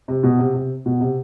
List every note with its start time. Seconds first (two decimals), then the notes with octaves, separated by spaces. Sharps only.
0.08 C3
0.23 B2
0.39 C3
0.54 C3
0.86 B2
1.01 C3